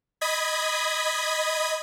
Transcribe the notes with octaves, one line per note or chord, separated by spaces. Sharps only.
D#5 B5 D#6 G#6 B6